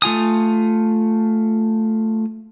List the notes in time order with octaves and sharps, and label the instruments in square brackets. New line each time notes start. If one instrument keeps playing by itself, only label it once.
[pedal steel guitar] A3 F4 G#5 D#6